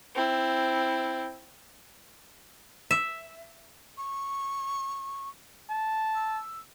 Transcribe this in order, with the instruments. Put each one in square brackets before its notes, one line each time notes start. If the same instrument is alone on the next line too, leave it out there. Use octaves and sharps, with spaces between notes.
[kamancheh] C4 E4
[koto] E5
[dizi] C#6
[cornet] A5
[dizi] E6